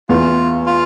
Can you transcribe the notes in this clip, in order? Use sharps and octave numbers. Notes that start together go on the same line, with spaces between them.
E2 F4
F4